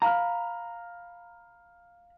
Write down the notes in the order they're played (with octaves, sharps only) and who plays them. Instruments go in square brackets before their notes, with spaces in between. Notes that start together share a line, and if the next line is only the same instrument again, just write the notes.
[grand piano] F5 F6 [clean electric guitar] A#5 B5